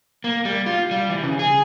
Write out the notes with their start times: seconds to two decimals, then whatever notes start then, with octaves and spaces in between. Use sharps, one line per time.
0.24 A#3
0.45 G3
0.66 F4
0.91 G3
1.10 E3
1.23 C#3
1.39 G#4